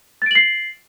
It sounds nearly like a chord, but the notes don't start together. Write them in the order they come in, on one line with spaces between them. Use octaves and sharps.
A6 D7 F#7 C7